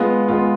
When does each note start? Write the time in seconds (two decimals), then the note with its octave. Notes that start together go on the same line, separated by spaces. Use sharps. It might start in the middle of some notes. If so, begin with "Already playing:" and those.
Already playing: G#3 B3 F4
0.28 G#3 B3 F4